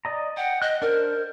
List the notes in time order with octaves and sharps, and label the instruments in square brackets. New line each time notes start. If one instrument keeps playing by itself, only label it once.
[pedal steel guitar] D5 D#5 A#5
[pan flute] F#5 [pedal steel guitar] G5
[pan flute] D#5 [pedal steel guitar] F#6
[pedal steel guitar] D4 C5 [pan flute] A#4